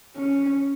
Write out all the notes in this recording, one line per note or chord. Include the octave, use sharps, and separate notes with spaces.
C#4